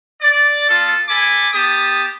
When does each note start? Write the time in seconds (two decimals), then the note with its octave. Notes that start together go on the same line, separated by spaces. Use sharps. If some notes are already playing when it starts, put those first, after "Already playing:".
0.21 D5
0.69 B3 F4 A4
1.09 A4 G#5 B5 D6
1.54 B3 G4 A5 D#6